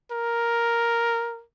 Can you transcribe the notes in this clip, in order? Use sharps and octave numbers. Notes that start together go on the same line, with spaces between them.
A#4